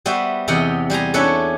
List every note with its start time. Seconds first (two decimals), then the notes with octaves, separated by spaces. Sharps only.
0.06 G3 B3 F#4 C5 E5
0.48 E2 C3 D#5 F#5 G5
0.90 G3 C5 G#5 A#5
1.14 C#4 D4 E4 A4 B4 C#5